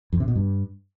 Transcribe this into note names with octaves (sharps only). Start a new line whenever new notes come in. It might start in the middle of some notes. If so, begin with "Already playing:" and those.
F2
C3
B2
G2